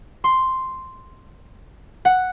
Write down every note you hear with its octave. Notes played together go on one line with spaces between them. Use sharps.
C6
F#5